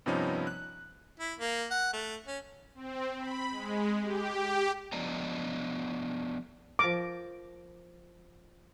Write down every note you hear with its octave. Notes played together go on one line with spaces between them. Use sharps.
G2 C3 F3 B3 C#4 D#4
F#6
E4
A#3
F#5
A3
C#4
C4
B5
G#3
G4
F3 B3 D4 D5 D#5 A#5
F3 A#4 D6